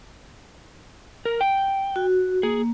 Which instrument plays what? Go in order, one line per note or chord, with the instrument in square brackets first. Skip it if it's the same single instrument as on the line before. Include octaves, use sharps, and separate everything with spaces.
[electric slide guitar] A#4
G5
[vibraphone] F#4
[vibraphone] A#3 [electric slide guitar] G#4